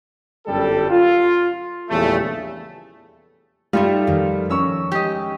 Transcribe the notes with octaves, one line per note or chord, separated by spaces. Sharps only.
G1 F#2 G3 A4
F4
A#1 E2 C#3 G3 A3
G3 A3 D#4 F4 A4 F5
F2 D#3 A#4
C#4 A#5 C#6 E6
G#3 G4 D#5